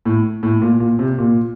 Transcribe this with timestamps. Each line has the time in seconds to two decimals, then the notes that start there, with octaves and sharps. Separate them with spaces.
0.05 A2
0.43 A2
0.62 A#2
0.80 A#2
0.99 C3
1.18 A#2